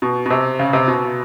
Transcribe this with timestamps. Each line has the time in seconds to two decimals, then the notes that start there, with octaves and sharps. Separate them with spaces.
0.02 B2
0.26 B2
0.30 C3
0.59 C#3
0.73 C3
0.88 B2